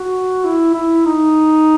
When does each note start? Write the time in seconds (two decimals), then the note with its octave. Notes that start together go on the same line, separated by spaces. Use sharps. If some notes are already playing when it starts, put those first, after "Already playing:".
Already playing: F#4
0.44 E4
0.74 E4
1.05 D#4